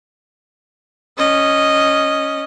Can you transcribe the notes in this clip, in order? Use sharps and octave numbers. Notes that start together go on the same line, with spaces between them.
C#4 D#5